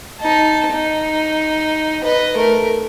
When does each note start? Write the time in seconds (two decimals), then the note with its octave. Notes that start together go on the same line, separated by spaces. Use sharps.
0.20 D#4 A5
0.72 D#4
2.04 B4 D#5
2.36 A3 A#4